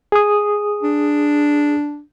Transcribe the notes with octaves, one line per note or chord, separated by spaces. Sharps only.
G#4 D#6
D4